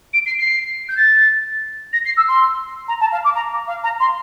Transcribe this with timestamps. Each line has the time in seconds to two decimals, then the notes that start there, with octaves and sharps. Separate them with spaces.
0.13 D7
0.26 C7
0.38 C7
0.88 G6
0.97 A6
1.92 A#6
2.05 C7
2.16 E6
2.28 C6
2.88 A#5
3.00 A5
3.11 F5
3.24 D6
3.35 A#5
3.67 F5
3.83 A#5
4.00 C6